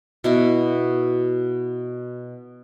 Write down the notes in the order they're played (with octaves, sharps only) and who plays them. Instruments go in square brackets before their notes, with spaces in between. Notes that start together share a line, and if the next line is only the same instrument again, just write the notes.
[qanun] B2 E4 F#4